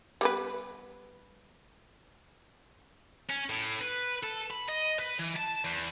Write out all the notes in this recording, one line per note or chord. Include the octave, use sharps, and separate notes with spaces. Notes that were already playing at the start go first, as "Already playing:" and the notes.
G3 B3 B4
C#4
A2
B4
A4
B5
D#5
B4
E3
A5
E2